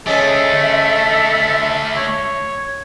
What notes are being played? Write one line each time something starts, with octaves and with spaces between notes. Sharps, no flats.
G#3 A3 C#4 D4 A4 E5
C#5